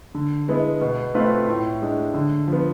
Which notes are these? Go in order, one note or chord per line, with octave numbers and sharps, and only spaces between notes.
D3
G#3 B3 E4
B2
A3 C4 F4 B4
A2
G#3 D4
D3
F3
B3